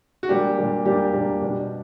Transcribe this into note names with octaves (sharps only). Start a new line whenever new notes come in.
F#4
A#2 G3 A#3 D4 G4
A#2 G3 A#3 D4
A#2 G3 A#3 D4 G4
A#2 G3 A#3 D4
B2 G3 B3 D4